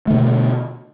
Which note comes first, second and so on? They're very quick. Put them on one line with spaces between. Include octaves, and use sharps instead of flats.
A3 D3 B2